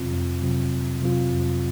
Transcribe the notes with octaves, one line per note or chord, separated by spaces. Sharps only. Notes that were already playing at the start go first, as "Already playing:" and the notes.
Already playing: F2 C3 F#3 C4 F4
F2
C3 F#3 C4 F4
F2
C3 F#3 C4 F4
F2